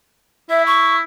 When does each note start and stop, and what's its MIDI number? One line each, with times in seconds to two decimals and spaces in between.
0.50 1.01 64
0.50 0.65 76
0.66 0.96 85